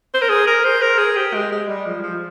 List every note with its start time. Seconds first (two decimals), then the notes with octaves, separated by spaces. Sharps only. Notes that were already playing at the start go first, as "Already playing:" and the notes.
0.14 C5
0.22 A#4
0.29 G#4
0.47 A#4
0.64 C5
0.82 A#4
0.98 G#4
1.16 G4
1.34 G#3
1.52 G#3
1.69 G3
1.86 F3
2.03 F3